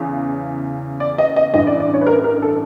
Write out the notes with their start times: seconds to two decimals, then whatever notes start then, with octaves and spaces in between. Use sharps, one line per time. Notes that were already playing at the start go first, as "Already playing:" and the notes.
Already playing: E2 C#3 E3
1.00 D5
1.18 D#5
1.36 D#5
1.54 A1 G2 E3 D#5
1.67 D5
1.80 D5
1.94 C#5
2.01 B4
2.07 A#4
2.24 A#4
2.42 A4